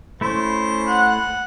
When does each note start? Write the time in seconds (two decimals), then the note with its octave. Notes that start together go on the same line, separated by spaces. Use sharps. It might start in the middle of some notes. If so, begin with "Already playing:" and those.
0.21 A3 C#4 E4 C5
0.87 F#5